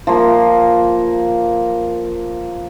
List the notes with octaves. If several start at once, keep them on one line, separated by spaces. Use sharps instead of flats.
F3 A#3